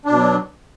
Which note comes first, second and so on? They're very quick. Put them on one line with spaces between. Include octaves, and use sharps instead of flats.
D4 B2 F#3